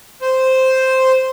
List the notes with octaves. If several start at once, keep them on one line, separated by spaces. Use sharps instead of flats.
C5